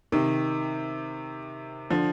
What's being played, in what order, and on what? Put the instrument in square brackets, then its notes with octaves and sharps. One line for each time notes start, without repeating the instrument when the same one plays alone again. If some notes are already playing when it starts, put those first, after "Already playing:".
[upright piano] C3 D#3
D3 F3